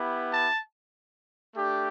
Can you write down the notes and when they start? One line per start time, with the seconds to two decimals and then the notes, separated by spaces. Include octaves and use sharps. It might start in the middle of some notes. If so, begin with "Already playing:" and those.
Already playing: B3 E4 G4
0.32 A5
1.55 A3 D4 G4